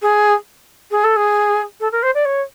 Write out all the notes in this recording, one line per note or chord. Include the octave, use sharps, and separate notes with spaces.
G#4
G#4
A4
G#4
A4
A#4
C5
D5
C#5